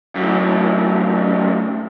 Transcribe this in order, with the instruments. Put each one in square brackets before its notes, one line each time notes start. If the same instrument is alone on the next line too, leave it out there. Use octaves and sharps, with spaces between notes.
[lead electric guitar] F#2 A2